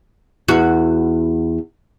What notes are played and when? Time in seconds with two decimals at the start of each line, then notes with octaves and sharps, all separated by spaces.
0.48 E2 F#4